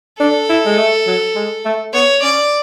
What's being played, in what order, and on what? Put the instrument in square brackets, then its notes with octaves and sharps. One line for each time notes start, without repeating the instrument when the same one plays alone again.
[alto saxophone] D4 [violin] A4
[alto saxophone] E4
G#3
A3
F#3
G#3
A3
[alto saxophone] B3 [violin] C#5
[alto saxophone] C#4 [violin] D5